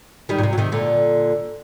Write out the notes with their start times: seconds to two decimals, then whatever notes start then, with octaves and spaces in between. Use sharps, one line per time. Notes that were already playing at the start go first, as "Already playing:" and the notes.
0.29 D#3 G3
0.38 A#2
0.43 C3
0.53 F#3
0.58 C3 D#3
0.72 A#2 D3